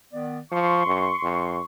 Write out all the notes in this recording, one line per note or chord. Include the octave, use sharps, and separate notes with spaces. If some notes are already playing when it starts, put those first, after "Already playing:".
D#3 B3 D5
F3 C6 C#6
F#2
F2